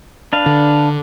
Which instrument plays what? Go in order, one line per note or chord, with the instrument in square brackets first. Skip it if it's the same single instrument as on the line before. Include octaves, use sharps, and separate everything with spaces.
[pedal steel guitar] D4 B4 F5
[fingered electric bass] D3